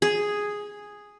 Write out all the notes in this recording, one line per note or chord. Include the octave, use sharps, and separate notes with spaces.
G#4